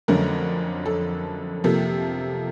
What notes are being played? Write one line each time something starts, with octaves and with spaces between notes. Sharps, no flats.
F2 D3 F#3 A3 C#4 A#4
A4
C3 F3 A#3 A4